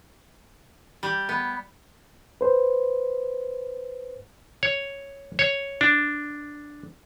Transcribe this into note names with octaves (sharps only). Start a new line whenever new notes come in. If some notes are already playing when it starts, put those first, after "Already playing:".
G3
B3
B4 C5
C#5
C#5
D4